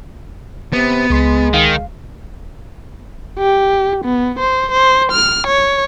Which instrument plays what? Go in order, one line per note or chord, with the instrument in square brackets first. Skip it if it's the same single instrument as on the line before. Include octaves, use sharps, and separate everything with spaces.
[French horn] C3 [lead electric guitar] B3
[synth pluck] C#2 C6 B6 [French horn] G#3
[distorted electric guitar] D#3 [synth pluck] F5
[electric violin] G4
B3
C5
C5
F6
C#5